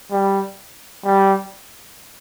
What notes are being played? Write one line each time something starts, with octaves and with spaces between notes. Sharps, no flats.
G3
G3